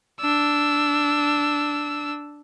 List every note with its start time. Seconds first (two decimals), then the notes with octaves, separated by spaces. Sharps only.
0.21 D4 E6